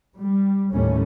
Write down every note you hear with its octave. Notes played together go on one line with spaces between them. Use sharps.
G3
D#2 A2 G3 A3 C#4